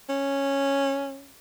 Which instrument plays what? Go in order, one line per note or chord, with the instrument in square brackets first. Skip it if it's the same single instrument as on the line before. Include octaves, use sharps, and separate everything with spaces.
[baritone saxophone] C#4